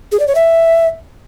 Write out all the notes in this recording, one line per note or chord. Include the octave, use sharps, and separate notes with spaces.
G#4
D5
C#5
E5